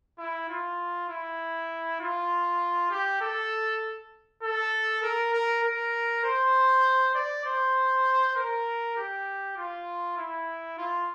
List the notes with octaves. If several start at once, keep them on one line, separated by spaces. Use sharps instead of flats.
E4
F4
E4
F4
G4
A4
A4
A#4
A#4
A#4
C5
D5
C5
A#4
G4
F4
E4
F4